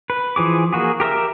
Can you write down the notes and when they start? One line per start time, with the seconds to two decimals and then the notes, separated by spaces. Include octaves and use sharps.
0.10 B4
0.36 E3 F3 G#4 D6
0.73 A#3 F#4 G#4
1.00 G4 A#4 C5 E5